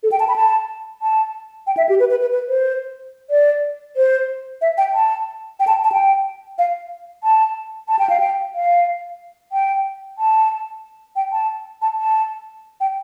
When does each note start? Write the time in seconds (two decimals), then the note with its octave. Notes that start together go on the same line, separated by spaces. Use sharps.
0.03 A4
0.12 G5
0.20 A5
0.28 B5
0.36 A5
1.02 A5
1.67 G5
1.77 E5
1.89 G4
2.00 B4
2.10 B4
2.21 B4
2.32 B4
2.48 C5
3.30 D5
3.96 C5
4.61 E5
4.78 G5
4.94 A5
5.60 G5
5.67 A5
5.84 A5
5.92 G5
6.58 F5
7.24 A5
7.88 A5
7.99 G5
8.10 F5
8.20 G5
8.55 F5
9.52 G5
10.18 A5
11.16 G5
11.32 A5
11.82 A5
11.97 A5
12.80 G5